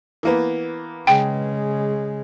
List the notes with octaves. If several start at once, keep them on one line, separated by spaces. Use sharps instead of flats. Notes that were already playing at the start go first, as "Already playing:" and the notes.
E3 A#3 B3
C#3 G#3 G5